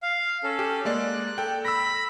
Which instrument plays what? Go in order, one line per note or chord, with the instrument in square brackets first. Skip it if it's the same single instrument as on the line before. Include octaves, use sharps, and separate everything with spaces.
[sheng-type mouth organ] F5
C#4 A4
[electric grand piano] G4
[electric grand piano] G#3 A#3 D5 [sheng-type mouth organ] F#6
[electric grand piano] A4 G5
[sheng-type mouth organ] B5 [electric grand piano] E6 A#6